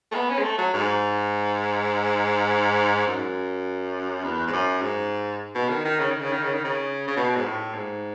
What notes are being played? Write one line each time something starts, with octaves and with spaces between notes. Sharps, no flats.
A3
B3
C#4
G#3
A3
F#3
G#2
F#2
E2
G#2
F#2
G#2
B2
D#3
D#3
C#3
D#3
C#3
D#3
C#3
D#3
C#3
C#3
B2
G#2
A2
G#2